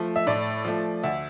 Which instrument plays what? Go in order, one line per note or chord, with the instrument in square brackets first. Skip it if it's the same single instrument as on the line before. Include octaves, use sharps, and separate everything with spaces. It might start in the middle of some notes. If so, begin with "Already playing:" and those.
Already playing: [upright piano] F3 A3
E5
A2 D5
F3 A3
D2 E5